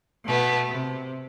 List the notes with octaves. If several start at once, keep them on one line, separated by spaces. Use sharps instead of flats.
B2 A3 B3
C3